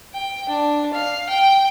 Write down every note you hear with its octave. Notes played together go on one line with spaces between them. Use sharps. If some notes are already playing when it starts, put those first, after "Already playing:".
G5
D4
F5
G5